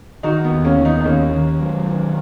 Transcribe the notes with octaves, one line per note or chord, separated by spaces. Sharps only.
D#3 D#4 F#4
B3
D#2
A#3 C#4
D#3
B3 D#4
D#4
D#2 A#3 C#4
D#3
F#3
D#3